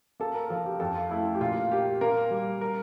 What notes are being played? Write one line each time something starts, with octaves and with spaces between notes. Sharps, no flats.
A#3 A4
A#4
F3 A4
G4
F2 A4
F4
A3 E4
G4
A#2 F4
A#3 G4
A#3 A#4
G3
A#4